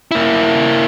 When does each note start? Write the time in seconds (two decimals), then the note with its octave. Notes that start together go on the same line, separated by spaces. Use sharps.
0.11 A#3 E4